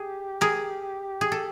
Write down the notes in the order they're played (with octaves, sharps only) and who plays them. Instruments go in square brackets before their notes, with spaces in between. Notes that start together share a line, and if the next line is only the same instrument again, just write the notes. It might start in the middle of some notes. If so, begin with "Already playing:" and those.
Already playing: [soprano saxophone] G4 [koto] G#4
[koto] G#4 A#4
G#4
A4